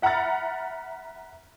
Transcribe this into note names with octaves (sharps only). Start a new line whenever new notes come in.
E5 F#5 A#5 B5 F6 A6